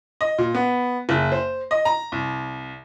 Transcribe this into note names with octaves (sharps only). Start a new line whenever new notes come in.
D#5
A#2
B3
F#1
C5
D#5
A#5
C2